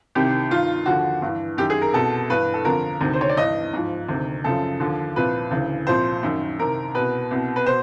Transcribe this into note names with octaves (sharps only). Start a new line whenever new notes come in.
C2 C3 D#3 G4
G2 D#3 F4
D#2 D3 F3 F#4
G2
E3
F#2 D#3 G4
G#4
A#4
C2 B2 A4
G2 E3 B4
A4
F2 D3 F3 A#4
D2 C3 D#3
C5
C#5
D5
G2 E3 D#5
G#2 F3
D2 C3 D#3
F#2 C#3 F3 A4
D#2 D3 F3
C2 A#2 F3 B4
D2 C#3 E3
C2 A#2 F3 C5
F#2 D#3
C2 C3 D#3 A#4
C2 B2 B4
C2 B2
B4
B2 C5